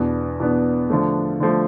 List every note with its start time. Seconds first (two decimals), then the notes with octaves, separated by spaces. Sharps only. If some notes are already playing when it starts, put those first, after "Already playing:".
Already playing: E2 B2 B3 D4
0.40 E2 B2 B3 D4
0.90 D3 F3 A3
1.40 D3 F3 A3